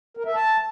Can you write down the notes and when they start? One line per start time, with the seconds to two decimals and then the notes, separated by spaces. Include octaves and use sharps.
0.17 A#4
0.26 E5
0.35 A5